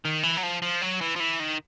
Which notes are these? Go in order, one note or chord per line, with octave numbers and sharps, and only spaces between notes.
D#3
E3
F#3
F3
F3
F#3
E3
F3
E3
D#3